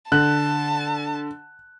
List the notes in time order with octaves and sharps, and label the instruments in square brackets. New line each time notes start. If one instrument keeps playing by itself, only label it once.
[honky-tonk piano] D3 [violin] A5 [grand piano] F#6